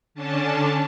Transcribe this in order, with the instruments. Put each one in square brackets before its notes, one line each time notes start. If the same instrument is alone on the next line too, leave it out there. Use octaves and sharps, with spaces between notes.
[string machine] D3 C#4 D4 A5